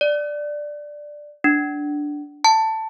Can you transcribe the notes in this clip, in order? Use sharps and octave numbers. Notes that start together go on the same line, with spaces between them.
D5
D4
A5